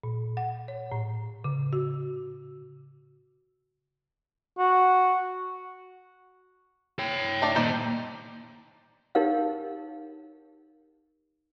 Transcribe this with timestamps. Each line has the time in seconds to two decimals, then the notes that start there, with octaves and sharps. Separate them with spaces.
0.03 A#2
0.37 F#5
0.68 C#5
0.92 A2
1.44 C#3
1.73 F#4
4.59 F#4
6.99 C#5 G5
7.42 A3 D4 D5
7.55 D#2 A#2 D#4 C5 D5
9.15 D#4 G4 A#4 C#5 F5